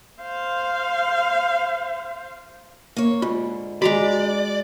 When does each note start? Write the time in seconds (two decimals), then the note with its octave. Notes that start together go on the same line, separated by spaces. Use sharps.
0.21 C5 F5
2.96 A#3 C#5
3.22 G#2 D3 F4
3.82 G#3 F#4 D5 A#5 B5